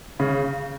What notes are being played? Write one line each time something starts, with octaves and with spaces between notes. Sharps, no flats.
C#3